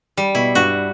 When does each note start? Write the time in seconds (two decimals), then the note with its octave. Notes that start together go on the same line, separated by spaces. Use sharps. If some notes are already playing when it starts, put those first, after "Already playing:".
0.17 G3
0.35 B2 E4
0.55 G2 F#4